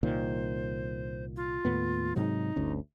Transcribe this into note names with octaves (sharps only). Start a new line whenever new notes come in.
C2 A#2 D#3 C5
F4
D#2 A2 B3
G#2 C3 F#3 D#4
G1 D2 C#4